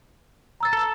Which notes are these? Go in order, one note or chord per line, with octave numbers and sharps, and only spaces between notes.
A#5 E6 A6
A4